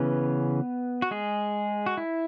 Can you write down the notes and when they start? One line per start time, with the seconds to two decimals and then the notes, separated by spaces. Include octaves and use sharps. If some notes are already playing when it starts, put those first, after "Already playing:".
Already playing: C#3 E3 B3 C#4 B4
1.02 F#4
1.11 G#3 G#4
1.86 F#4
1.97 E4